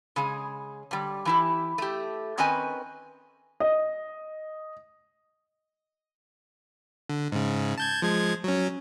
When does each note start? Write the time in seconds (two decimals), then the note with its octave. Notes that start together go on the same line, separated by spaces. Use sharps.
0.16 C#3 G#3 G#4
0.91 D3 G3
1.25 E3 E4 G4
1.78 A3 G4
2.38 D#3 C4 C#4 B4 D#5 G#5
3.60 D#5
7.09 D3
7.32 G#2 C#3
7.78 A5 G6 G#6
8.02 F3 G#3 G#6
8.44 F#3 C#4